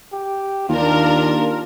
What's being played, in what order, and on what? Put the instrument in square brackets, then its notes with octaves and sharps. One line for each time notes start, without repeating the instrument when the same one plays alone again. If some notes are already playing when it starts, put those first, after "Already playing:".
[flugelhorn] G4
[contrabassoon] D#2 [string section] D4 A#4 [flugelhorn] F4